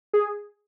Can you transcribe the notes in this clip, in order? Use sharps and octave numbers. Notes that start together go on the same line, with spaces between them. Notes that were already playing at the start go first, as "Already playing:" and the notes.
G#4